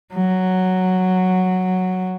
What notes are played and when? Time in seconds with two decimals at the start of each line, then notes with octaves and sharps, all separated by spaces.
0.13 F#3